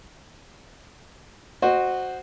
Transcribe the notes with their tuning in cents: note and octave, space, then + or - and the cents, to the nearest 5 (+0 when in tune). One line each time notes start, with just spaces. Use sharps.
F#4 +0 C5 +0 D#5 -30